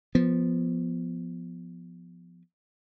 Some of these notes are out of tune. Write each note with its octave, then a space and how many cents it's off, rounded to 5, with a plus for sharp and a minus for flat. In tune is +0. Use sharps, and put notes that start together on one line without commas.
F3 +0 B3 +0